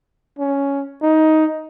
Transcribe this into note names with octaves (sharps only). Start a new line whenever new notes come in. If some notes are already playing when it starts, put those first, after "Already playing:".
C#4
D#4